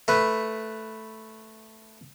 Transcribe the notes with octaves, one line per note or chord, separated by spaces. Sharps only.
A3 B4